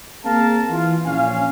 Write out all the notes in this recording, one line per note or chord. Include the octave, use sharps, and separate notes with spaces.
A#3 C4 G#4 A#4 F5 A5
E3 F4 F5
A#1 C#4 F5 G#5